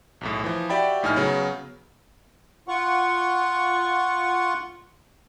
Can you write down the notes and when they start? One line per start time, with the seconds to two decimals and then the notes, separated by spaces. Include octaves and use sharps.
0.21 B1 E2 A2
0.44 E3 F3
0.69 F#4 G4 D5 E5 G5 B5
1.03 A#1 A2 D#4 G#5 F6
1.16 C#3 F#3 B3
2.68 F4 F#5 C#6